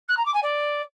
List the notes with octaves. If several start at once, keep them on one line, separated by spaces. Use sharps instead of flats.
F#6
A#5
D6
G#5
D5